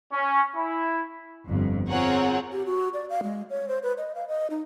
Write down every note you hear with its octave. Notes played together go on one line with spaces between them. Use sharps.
C#4
E4
G1 F2
C4 F4 G#4 A#4 C#5 F#5
G4
F#4
D5
F5
G#3
C#5
C5
B4
D#5
F5
D#5
D#4